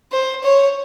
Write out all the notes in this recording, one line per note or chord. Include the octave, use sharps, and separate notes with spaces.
C5
C#5